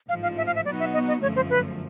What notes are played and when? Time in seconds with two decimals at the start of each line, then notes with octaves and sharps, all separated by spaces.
0.09 A1 G#2 F3 F5
0.23 F5
0.37 E5
0.46 F5
0.56 E5
0.65 B2 F#3 B3 D#4 F#4 D5
0.80 E5
0.94 D#5
1.08 D#5
1.22 G1 F#2 D3 F3 A3 C#5
1.36 C5
1.50 B4